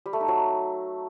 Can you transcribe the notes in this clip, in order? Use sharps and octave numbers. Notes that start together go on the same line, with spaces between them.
G3
A3
D#4
F#3